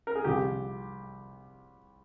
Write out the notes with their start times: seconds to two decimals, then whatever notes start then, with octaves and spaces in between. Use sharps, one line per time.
0.07 A#4
0.15 G#4
0.24 C2 C3 F3 G4